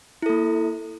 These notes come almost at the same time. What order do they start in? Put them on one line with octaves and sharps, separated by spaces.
E4 A4 A#3